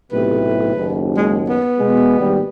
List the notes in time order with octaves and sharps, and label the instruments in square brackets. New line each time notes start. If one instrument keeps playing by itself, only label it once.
[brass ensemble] B1 A2 C3 [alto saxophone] B4
[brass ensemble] F#1 D#2
[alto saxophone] G#3
B3
[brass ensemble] B2 G#3
G#1 D#2 G3